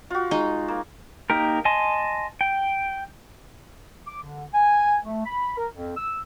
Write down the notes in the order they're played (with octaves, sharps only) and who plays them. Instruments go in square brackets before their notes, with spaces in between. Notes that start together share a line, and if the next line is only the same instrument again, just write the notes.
[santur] F4 F#4
[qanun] G#3 D#4
[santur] A#3
[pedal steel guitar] A#3 D#4 G4 A#4
D#5 G#5 A5 C6
G5
[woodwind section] D6
D3
G#5
A3
B5
A#4
F2
E6